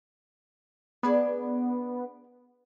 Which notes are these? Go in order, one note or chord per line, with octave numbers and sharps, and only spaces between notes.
B3 D4 G#4 D5